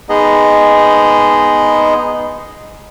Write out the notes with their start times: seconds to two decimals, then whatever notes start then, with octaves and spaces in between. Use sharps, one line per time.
0.09 G#3 B3 D#4 G#4 D#5